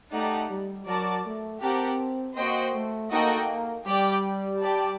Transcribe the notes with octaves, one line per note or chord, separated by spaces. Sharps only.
A3 D#4 G4 D5 F#5 A5
G3
F#3 F#4 A#4 D5 A5
A3
C4 G4 A#4 F#5 A5
A#3 F#4 C5 D#5 G5
A3
A#3 D#4 F#4 A4 D#5 G5
G3 G4 D5 G5
G4 D5 A5